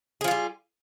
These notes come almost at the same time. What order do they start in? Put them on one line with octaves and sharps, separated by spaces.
G#4 F3 F4 G3